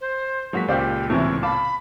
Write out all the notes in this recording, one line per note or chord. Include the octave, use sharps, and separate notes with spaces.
C5
F#3 G#3 A#3 F#4 B6
C#2 A#2 G4 C5 D5 F5
A2 C3 E3 C#5
F5 A5 B5 D6